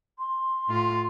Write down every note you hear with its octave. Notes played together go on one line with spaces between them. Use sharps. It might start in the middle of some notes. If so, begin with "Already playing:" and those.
C6
A2 F4